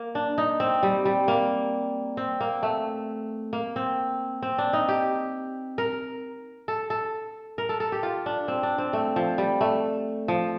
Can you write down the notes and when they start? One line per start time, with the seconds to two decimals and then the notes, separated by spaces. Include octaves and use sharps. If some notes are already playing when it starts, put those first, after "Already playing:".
Already playing: A#3
0.15 D4
0.38 D#4
0.60 C4
0.83 G3
1.05 G3
1.28 A#3
2.17 C4
2.40 A#3
2.63 A3
3.53 A#3
3.76 C4
4.42 C4
4.58 D4
4.73 D#4
4.88 G4
5.78 A#4
6.68 A4
6.90 A4
7.58 A#4
7.69 A4
7.80 A4
7.92 G4
8.03 F4
8.26 D4
8.48 C4
8.63 D4
8.78 C4
8.93 A3
9.16 F3
9.38 G3
9.61 A3
10.28 F3